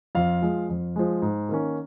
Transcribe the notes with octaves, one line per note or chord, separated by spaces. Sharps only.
F2 F4 F5
F3 G#3
F2
F3 G#3
G#2
D#3 A#3 C#4